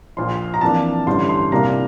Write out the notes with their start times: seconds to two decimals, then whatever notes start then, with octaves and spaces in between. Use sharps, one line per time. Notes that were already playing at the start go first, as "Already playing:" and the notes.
0.17 A#1 A#2 F3 C6
0.54 A#5
0.61 F2 E3 A#3 D4 A5
1.06 A1 G2 D3 G3 C6
1.29 C6
1.52 C2 A#2 G3 A#3 D4 A#5